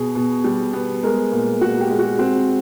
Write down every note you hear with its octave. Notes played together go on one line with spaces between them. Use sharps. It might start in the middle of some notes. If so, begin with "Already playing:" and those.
Already playing: B2 G#4
B2
G3
B3
G#3 A#4
A#2
A#2 F#4
G4
G#3
F#4
C4 F#4